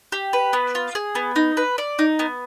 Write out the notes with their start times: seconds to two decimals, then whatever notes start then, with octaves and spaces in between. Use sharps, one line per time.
0.12 G4
0.33 B4
0.53 B3
0.75 F4
0.95 G#4
1.15 B3
1.36 D#4
1.57 B4
1.78 D5
1.99 D#4
2.19 B3